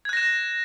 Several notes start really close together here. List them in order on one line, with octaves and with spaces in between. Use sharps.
G#6 F#6 A#6 E7